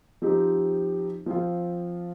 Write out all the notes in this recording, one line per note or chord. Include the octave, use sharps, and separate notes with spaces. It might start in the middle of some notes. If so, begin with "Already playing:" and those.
F3 C4 D#4 G4
F3 C4 F4